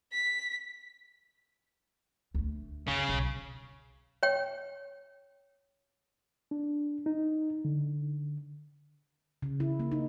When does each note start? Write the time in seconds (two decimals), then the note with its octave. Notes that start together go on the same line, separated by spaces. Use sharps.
0.13 B6
2.34 D2 A3
2.88 F#2 C#3
3.09 B1 F#3
4.23 C#5 G5
6.51 D4
7.06 D#4
7.65 D3
9.42 C#3
9.60 E4
9.80 A#3
9.92 D#4